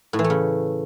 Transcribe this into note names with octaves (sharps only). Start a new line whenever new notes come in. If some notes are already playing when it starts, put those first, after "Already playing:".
A2
E3
A3
C#3